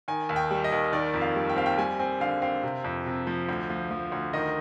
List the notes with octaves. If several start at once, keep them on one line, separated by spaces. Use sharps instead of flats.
D#3 G#5
D#2
G5
G3
D#5
D#2
D#3 D5
F2
F5
G3
G5
C4 F5
G5
G3 G#5
C4 G#5
D3 F5
C4 F5
C3
F2
C3
F3
D2
F3
F3
D2
D#3 D#5